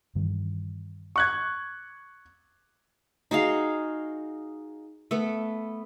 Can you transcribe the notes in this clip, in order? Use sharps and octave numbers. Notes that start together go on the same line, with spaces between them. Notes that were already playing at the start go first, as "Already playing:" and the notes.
G2 D#3 E3
C#6 F#6 G#6
D#4 F#4 G#4 F5
A3 B3